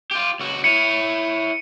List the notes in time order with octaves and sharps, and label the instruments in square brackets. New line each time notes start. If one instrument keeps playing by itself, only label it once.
[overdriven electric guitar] F4 G4
C#2 F#4
[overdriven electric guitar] E4 C#5 [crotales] C#7 D#7